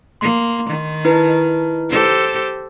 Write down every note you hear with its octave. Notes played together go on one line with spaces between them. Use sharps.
A#3 C6
D#3
D#4 E4 B4
G4 A4 C5